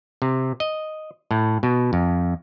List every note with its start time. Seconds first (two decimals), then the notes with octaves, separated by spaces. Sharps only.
0.22 C3
0.60 D#5
1.31 A2
1.63 B2
1.93 F2